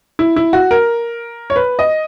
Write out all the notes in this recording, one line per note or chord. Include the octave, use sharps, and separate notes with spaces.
E4
E4
F#4
A#4
C#5
B4
D#5